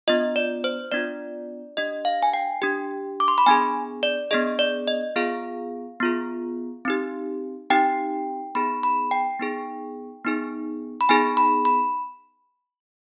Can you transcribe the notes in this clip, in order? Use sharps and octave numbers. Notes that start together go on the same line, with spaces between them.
B3 D4 F4 D#5
D5
C5
B3 D4 F4 D5
D4 G4 D#5
F5
G#5
G5
D4 G4
D6
C6
B5
B3 D4 G#4 G#5
D5
B3 D4 G#4 D#5
D5
D#5
B3 F4 G#4 F5
B3 F4 G#4
C4 D#4 G4
C4 D#4 G4 G5
B3 D#4 G#4 B5
B5
G5
B3 D#4 G#4
B3 D#4 G#4
B5
B3 D#4 G#4 G#5
B5
B5